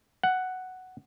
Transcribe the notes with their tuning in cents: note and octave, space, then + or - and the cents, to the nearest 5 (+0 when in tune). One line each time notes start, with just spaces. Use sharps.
F#5 +5